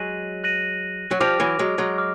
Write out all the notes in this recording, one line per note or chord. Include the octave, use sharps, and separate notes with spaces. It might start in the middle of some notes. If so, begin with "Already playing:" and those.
Already playing: F#3 G#3 F#6 A#6 D#7 F#7
F#6 A#6 D#7 F#7
F#3
F3 G3 D6 F6 A#6 D7 F7
E3 F#3
F#3 G#3
F#3 G#3
D6 F6